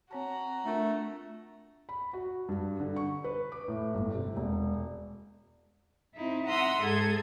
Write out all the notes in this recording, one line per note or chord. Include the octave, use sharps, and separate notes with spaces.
C4 F#4 C#5 A5 A#5
A3 D4 F4 A#4
B5
F#4
G2
D3
C#6
B4
D6
A2
G1
C3
E1
C4 D#4 E4
E5 F#5 A#5 C6 D#6 E6
G#2 G#4 A4 G#6